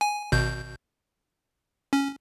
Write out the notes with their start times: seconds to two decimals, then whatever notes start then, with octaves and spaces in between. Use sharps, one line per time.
0.01 G#5
0.32 G#1 B2 G6
1.93 C#4